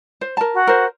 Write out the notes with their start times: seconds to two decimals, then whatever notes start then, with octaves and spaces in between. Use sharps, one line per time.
0.21 C5
0.37 A#4 A5
0.54 F#4
0.67 A#4 C5